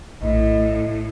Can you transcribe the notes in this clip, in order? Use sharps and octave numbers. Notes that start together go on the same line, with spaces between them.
A#1 A2 D#5